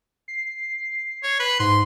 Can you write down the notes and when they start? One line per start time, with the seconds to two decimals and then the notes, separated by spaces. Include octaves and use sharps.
0.28 C7
1.23 C#5
1.39 B4
1.59 G#2 C6